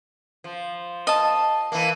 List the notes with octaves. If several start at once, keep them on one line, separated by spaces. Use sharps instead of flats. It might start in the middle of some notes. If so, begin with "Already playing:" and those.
F3
D#5 A5
E3 A#3